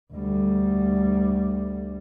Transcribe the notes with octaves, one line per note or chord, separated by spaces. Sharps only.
D2 G3